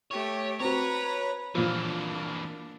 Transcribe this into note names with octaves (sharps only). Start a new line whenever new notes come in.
A3 G4 C#5
C4 F#4 B4 C#5 A#5
A#2 E3 F3 A#3 D4